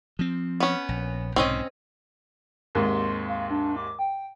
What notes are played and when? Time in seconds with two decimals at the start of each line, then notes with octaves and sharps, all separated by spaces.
0.19 F3 C4
0.60 B3 C#4
0.89 A#1
1.36 B1 G#2 C3 C4 C#4 D#5
2.75 D#2 G#2 C3 C6
3.29 F5
3.51 D4
3.76 D6
3.99 G5